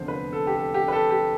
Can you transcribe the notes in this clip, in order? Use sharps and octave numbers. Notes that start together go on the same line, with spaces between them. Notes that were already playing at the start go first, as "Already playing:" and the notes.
Already playing: F1 E2 D3 F3 C5
B4
A4
G4
A4
G4
B4
A4
G4